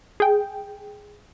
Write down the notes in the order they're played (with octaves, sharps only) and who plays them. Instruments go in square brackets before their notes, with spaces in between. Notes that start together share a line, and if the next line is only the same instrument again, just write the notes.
[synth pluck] G#4 G5